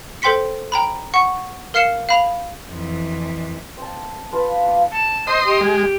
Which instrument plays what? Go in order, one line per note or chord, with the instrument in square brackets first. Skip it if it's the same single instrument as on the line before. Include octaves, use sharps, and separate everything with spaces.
[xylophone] A4 C5 G5 C6 B6 C#7
G5 A#5 B5
F#5 C#6 C#7
A#4 F5 F6 C7 C#7 E7
F5 B5 F7
[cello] F2 E3
[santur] C4 A5
F4 B4 F5 A5
F4 D6
[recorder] A5
[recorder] C5 [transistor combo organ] D#5 C6
[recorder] G4
[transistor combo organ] G#3